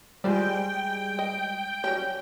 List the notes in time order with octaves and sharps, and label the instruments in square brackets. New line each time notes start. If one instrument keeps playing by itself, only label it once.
[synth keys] G3 G#3 [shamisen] F4 C5 D5 [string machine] G5
[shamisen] D#5
[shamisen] F#3 G3 C#4 [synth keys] G5